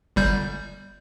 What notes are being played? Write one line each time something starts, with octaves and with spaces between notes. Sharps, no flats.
G1 G3 G6